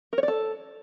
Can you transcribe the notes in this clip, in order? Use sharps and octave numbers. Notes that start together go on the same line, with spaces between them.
A#4
C#5
D5
A4